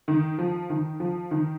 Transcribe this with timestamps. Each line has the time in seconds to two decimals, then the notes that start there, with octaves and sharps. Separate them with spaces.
0.08 D#3
0.39 F3
0.70 D#3
1.00 F3
1.31 D#3